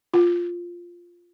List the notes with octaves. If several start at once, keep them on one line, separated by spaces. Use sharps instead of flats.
F4